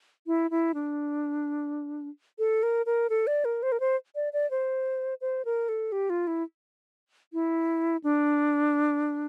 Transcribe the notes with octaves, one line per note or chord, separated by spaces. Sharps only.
E4
E4
D4
A4
A#4
A#4
A4
D5
A#4
C5
A#4
C5
D5
D5
C5
C5
A#4
A4
G4
F4
E4
E4
D4